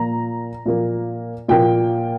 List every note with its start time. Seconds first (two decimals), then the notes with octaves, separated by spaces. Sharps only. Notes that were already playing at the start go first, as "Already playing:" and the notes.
Already playing: A#2 F3 A#3 A#5
0.66 A#2 F3 A#3
1.48 A#2 F3 A#3 G5